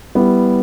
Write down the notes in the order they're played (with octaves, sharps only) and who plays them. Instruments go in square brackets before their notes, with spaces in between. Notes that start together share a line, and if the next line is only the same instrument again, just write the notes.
[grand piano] G3 B3 E4